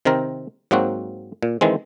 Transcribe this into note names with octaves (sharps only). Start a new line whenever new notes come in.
C3 D#3 C4 A#4
G#2 F#3 A#3 C4 F#4
A#2
D#3 E3 G#3 C4